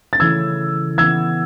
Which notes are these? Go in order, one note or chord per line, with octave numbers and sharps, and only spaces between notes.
A6
C#3 E3 A3 E4 E6 G#6
E3 B3 E4 E6 G#6